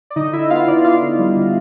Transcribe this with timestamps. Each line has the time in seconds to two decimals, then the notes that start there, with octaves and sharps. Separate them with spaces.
0.10 D5
0.16 D3 D#4 D#5
0.33 D3 E4 E5
0.50 B3 F4 F5
0.68 D3 D5
0.84 D3 F4 F5
1.02 D3
1.19 G3
1.36 D3